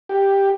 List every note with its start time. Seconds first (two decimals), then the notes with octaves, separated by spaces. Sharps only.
0.09 G4